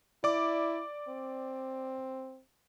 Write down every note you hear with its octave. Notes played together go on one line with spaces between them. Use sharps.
E4 D5 D6
C4